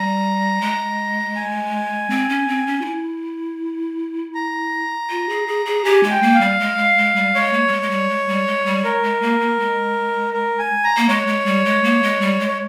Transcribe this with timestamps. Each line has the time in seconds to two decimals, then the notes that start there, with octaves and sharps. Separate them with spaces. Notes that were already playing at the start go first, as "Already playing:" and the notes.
Already playing: G3 A#5
0.61 G#3
1.36 G#5
2.10 C4
2.29 C#4
2.48 C4
2.67 C#4
2.82 F4
2.85 E4
4.35 A#5
5.10 F4
5.29 G#4
5.48 G#4
5.66 G#4
5.85 G4 G#5
6.04 G#3
6.10 G5
6.22 A#3
6.35 F5
6.41 G3
6.60 G#3
6.78 G#3
6.98 G#3
7.16 G3
7.34 G#3 C#5
7.53 A#3
7.68 G3
7.72 G#3
7.82 G#3
7.91 G3
8.10 G#3
8.28 G3
8.47 G#3
8.66 G3
8.84 G#3 A#4
9.03 G#3
9.22 A#3
9.41 A#3
9.59 G#3
10.34 A#4
10.59 G#5
10.84 A#5
10.97 A#3
11.09 G#3 C#5
11.27 G#3
11.46 G3
11.65 G#3
11.84 A#3
12.03 G#3
12.21 G3
12.40 G#3
12.48 C#5